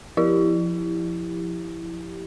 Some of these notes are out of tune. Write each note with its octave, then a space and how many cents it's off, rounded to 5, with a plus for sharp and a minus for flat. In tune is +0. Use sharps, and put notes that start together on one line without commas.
F3 +0 E4 +0 G4 +0